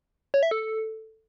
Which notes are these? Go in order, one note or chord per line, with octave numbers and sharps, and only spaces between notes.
C#5
E5
A4